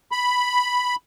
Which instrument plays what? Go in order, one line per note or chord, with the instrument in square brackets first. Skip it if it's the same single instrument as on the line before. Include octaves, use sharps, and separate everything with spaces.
[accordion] B5